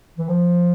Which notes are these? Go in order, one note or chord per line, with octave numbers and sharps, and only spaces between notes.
E3
F3